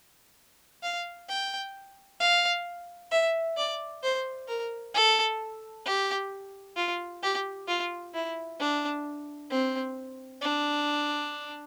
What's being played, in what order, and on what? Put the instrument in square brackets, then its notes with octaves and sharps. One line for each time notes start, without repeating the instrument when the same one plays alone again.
[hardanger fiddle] F5
G5
F5
E5
D5
C5
A#4
A4
G4
F4
G4
F4
E4
D4
C4
D4